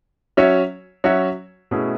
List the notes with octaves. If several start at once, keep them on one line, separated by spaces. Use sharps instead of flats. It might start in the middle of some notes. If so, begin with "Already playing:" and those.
F#3 C#4 F#4 C#5 E5
F#3 C#4 F#4 C#5 E5
B2 A3 C#4 E4 G#4